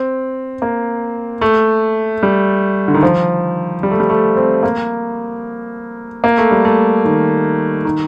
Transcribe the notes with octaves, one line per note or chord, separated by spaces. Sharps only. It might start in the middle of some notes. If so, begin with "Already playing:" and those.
Already playing: C4
A#3
A3
G3
D3
D#3
F3
G3
A3
G3
A3
C4
A#3
A#3
A3
G3
A3
D#3
D#3